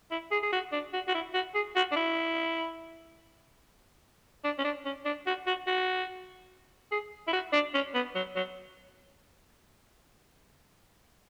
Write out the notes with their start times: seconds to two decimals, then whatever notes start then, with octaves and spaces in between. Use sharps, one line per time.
0.11 E4
0.32 G#4
0.43 G#4
0.53 F#4
0.72 D4
0.93 F#4
1.08 F#4
1.14 E4
1.34 F#4
1.55 G#4
1.76 F#4
1.92 D4
1.96 E4
4.44 D4
4.59 C#4
4.64 D4
4.85 C#4
5.05 D4
5.27 F#4
5.47 F#4
5.67 F#4
6.92 G#4
7.28 E4
7.33 F#4
7.53 D4
7.74 C#4
7.94 B3
8.15 F#3
8.36 F#3